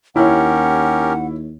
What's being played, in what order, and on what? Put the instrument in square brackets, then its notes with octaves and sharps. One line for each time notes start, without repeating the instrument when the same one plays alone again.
[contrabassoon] D#2 [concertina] C#4 G4 A#4 [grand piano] E4 C#5 [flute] F#5